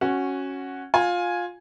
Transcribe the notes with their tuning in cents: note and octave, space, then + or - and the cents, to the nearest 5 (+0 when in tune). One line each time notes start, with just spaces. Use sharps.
C#4 -10 F#4 +0
F4 +15 G#5 +0